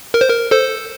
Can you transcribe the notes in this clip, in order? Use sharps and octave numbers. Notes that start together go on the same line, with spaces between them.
A#4
C5
A#4
A4 C5